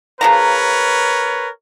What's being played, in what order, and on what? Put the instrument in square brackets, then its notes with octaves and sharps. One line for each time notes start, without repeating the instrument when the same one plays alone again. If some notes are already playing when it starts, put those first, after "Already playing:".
[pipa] C#3 F3 A#5 [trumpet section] A#4 B4 C#5